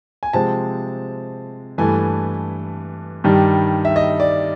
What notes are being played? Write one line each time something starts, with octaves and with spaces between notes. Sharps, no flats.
G#5
C3 F3 G#3 C4 A5
G2 E3 A3 G#5
G2 D#3 G3
E5
D#5
D5